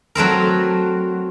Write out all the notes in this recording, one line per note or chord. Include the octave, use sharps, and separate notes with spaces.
F#3 A3 C4 A#4